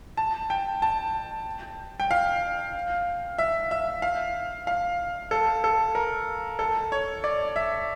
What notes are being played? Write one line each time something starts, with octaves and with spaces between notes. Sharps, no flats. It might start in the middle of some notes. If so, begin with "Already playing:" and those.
A5
G5
A5
G5
F5
E5
E5
F5
F5
A4
A4
A#4
A4
C#5
D5
E5